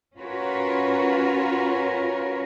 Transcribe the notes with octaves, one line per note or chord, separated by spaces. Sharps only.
C#4 F4 F#4 A#4 B4 C#5